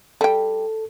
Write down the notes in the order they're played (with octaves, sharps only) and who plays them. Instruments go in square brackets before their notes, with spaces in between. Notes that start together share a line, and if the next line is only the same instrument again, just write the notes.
[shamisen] G3 G5 [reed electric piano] A4